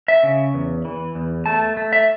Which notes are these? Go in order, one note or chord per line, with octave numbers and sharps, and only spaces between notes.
E5
C#3
E2
E3
E2
A3 A5
A3
E5